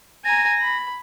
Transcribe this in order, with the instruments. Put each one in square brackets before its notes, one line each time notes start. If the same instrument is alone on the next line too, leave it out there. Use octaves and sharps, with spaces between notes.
[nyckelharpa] G#5 A#5 [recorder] A#6
[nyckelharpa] B5